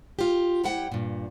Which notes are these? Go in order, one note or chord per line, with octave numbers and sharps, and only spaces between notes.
F4 G4
G3 E4 G4 C5 F#5 G5
G2 A#2